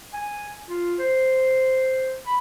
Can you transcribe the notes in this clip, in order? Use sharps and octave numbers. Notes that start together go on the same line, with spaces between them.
G#5
F4
C5
B5